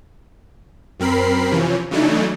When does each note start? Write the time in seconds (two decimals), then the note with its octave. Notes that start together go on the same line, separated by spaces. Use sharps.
1.00 F#2 C4 A#4 B5 C7
1.51 C3 E3 F3 C#4
1.91 C#3 E3 F#3 A3 D4 D#4